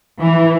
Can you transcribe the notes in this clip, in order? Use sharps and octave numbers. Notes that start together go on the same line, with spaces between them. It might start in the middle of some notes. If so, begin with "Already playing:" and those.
E3